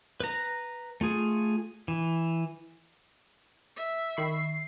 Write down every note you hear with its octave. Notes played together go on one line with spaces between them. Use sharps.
B4 A#5
A3 F4 G#4
E3
E5
D#3 B5 C#6 C7